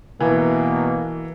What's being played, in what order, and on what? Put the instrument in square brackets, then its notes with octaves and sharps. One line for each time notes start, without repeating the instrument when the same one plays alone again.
[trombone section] B2 A#3 [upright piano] E3